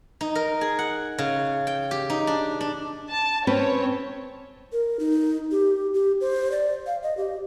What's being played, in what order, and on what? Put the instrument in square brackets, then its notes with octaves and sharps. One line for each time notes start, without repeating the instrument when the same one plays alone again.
[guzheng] D#4
A#4
G#4
F#5
C#3
G5
G4
D#4
D4
D4
[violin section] A5
[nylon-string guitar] C4 C#4 B4 [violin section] C#5
[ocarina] A#4
D#4
G4
G4
C5
D5
F5
D#5
G4